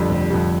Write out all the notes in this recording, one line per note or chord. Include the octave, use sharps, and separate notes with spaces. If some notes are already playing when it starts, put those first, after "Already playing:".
Already playing: F2 D3 G3
F1
F2 D3 G3